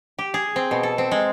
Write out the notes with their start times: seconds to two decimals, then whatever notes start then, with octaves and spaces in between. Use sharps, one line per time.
0.19 G4
0.34 G#4
0.56 C4
0.71 B2
0.83 A4
0.98 C4
1.11 G#3